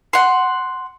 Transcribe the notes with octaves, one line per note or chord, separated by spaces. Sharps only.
F#5 C6